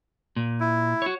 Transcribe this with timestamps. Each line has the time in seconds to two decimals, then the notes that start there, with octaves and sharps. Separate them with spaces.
0.36 A#2
0.60 E4
1.02 F#4 C#5